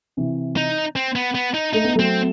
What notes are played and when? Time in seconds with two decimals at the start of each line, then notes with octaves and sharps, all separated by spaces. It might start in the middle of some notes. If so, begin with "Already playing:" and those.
0.17 C3 E3
0.57 D#4
0.96 C4
1.16 B3
1.35 B3
1.54 D#4
1.73 A3 D#4
1.84 B3
1.95 F#3 A3 C4